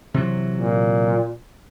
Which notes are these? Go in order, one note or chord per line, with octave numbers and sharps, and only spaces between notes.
C3 E3 F#3
A#2